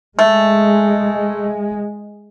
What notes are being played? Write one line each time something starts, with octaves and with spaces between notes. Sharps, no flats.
G#3 A3